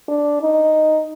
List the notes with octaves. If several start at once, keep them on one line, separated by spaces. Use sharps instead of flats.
D4
D#4